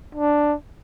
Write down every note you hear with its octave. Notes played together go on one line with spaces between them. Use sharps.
D4